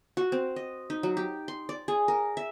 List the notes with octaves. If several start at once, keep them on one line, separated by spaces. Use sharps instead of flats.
F#4
C4
D#5
D#4
F#3
G4
C6
D5
G#4
A#4
E5